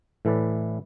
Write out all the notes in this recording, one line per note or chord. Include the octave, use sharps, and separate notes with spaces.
A2 E3 A4 B4 D5